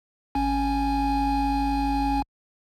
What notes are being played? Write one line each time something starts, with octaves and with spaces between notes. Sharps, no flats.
G#1 C#4 G#5